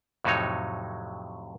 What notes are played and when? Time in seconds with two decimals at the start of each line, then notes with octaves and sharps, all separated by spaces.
0.24 F2 A2 C3 F#3 D#4 C#5